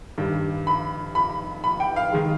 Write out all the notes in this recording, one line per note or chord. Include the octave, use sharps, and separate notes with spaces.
G2 D#3 G3
B5
B5
B5
G5
F5
D#3 G#3